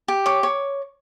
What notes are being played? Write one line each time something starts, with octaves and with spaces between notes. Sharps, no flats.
G4
C#5 D6
C#5